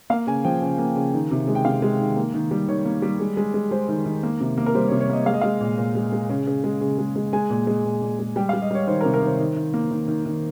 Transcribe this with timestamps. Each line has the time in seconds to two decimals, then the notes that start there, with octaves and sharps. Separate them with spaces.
0.10 A#3 F5
0.27 C#3 G#5
0.45 F3 G5
0.62 C#3
0.78 A#3
0.96 C#3
1.14 D#3
1.31 C3
1.48 G#3
1.55 G5
1.65 C3 F5
1.82 G#3
1.99 D#3
2.17 A#3
2.34 D#3
2.51 G3
2.68 D#3 C#5
2.85 A#3
3.02 G3
3.19 G#3
3.37 G#3
3.54 G#3
3.71 G#3 C5
3.89 D#3
4.06 D#3
4.23 A#3
4.40 C3
4.58 A#3
4.66 A#4
4.75 G3 C5
4.88 C#5
4.92 C3
5.01 C#5
5.09 A#3 D#5
5.26 G#3 F5
5.34 D#5
5.41 G#3 F5
5.61 A#2
5.78 A#2
5.95 G#3
6.12 G#3
6.30 C#3
6.47 C#3
6.64 G#3
6.81 C#3
6.98 G#3
7.16 G#3
7.33 G#3 G#5
7.50 A#2
7.67 G#3
7.85 A#2
8.01 A#2
8.19 G#3
8.36 G3 G5
8.49 F5
8.53 G3
8.62 D#5
8.71 G3 C#5
8.87 D#3 C5
9.01 A#4
9.05 C3
9.14 A#4
9.22 D#3 C5
9.39 D#3
9.56 D#3
9.74 A#3
9.91 D#3
10.08 D#3
10.25 D#3